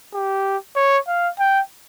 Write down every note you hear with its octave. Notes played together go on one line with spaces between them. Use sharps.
G4
C#5
F5
G5